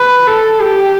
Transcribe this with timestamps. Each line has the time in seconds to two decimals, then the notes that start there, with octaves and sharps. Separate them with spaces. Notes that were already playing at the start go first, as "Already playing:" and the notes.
Already playing: B4
0.27 A4
0.61 G4